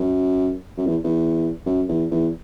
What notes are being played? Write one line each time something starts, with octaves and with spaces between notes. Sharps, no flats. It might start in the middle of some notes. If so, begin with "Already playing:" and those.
Already playing: F#2
F#2
E2
E2
F#2
E2
E2